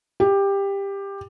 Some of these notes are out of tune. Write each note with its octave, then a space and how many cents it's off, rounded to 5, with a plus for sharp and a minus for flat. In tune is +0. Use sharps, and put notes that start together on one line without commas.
G4 +15